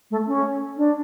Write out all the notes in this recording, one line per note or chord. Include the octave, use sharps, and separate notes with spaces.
A3
C#4
D4